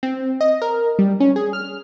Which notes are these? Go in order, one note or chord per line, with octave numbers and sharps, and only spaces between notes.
C4
D#5
A#4
G3
C#4
G#4
F6